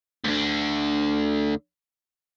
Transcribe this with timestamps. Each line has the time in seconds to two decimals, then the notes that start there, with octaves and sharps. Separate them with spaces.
0.25 D2 D3